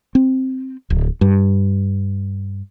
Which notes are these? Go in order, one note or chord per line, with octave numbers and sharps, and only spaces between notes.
C4
D1
G2